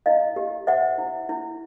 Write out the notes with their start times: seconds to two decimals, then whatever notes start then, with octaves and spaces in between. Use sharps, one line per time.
0.06 E4 D#5 F5
0.36 G4
0.67 C5 E5 F#5
0.98 E4
1.29 E4